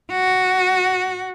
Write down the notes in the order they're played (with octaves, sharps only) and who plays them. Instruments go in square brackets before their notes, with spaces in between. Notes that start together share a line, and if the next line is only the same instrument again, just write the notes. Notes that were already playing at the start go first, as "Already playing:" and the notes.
[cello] F#4